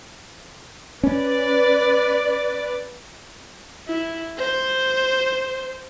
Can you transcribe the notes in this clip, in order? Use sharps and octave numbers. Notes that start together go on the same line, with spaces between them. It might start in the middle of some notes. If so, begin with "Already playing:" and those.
C#4 B4 D5
E4
C5